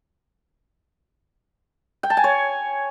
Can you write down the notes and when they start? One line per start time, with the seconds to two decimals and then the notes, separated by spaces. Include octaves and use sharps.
2.03 G5
2.10 A5
2.17 G#5
2.24 C#5